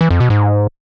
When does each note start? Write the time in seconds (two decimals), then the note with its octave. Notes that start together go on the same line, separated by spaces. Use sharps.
0.01 E3
0.11 F2
0.20 B2
0.30 G#2